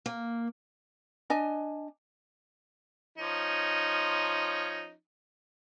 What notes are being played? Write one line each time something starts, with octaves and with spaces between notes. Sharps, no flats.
A#3
D4 D#5 G#5
F3 C#4 D#4